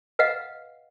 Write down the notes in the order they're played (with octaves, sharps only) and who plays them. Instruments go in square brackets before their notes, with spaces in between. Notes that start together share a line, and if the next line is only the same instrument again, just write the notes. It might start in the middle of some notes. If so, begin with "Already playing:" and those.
[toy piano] B4 D#5 F5 F#5